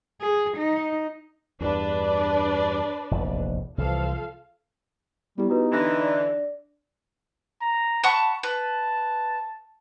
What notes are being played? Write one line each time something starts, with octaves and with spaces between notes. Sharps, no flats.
G#4
D#4
E2 G2 D4 B4 D5
F1 A#1 E2
C2 E3 F3 A4 F5
G3 B3 E4 G4
D#4 F#4 B4
D3 E3 D4 B5 A#6
D5
A#5
F#5 A5 B5 C#6
B4 A5